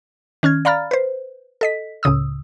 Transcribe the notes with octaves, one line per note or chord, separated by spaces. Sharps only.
D#3 C#4 F6 G#6
D5 F5 A#5 B5 F6 A6
B4 C5
A4 D#5 B6
C#2 A2 C#3 D#6 E6